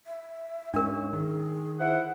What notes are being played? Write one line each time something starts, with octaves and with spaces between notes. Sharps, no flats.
E5
G#2 C#4 D4 A#4
D#3 G#4
E4 C5 F#5